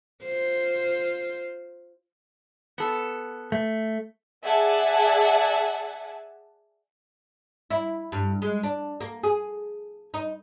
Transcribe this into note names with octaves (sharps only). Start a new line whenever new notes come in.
F4 C5
B3 A4
A3
G#4 D5 E5 F#5 G#5 A5
E4
G2
G#3
D4
A#3
G#4
D#4